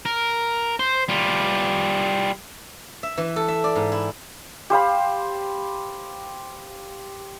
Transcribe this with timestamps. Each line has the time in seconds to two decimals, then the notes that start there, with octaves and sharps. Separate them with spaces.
0.05 A#4
0.79 C5
1.09 G3 F4
3.03 E5
3.18 E3
3.36 A4
3.48 E5
3.64 D5
3.75 G#2
3.92 E4
4.70 G4 C5 F5 B5